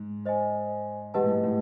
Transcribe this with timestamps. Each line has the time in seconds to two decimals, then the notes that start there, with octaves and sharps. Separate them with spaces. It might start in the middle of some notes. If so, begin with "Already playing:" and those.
Already playing: G#2
0.25 C5 D#5 G#5
1.14 G#2 G4 B4 D#5 F#5 A5
1.24 A2
1.33 G#2
1.44 A2